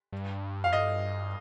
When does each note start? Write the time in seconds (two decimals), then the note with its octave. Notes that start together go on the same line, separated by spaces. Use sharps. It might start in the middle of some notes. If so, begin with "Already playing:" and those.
0.13 G2
0.64 F2 F5
0.73 G2 D#5